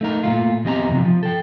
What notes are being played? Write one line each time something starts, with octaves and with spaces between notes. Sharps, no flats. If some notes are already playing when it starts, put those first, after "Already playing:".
A3 D#4 A#4
A#2 A3 F4
E2 C4 G4 D#5 G#5 A#5
C3 F3
F3
A4 G5